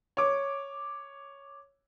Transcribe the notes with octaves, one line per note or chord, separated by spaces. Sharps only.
C#5 D6